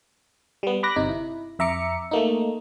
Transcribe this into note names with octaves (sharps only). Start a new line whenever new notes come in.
G3 B3
B5 D6 F#6 A#6
G1 C3 D#4 D6
E4
F2 E5 A#5 D6 C#7
A3 A#3 D#4